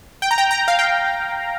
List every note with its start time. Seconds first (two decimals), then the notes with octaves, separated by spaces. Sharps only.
0.22 G5
0.31 A#5
0.38 G5
0.51 A#5
0.68 F5
0.79 G5